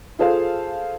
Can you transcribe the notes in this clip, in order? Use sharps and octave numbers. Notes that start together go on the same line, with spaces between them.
F4 G#4 A4 C5 F5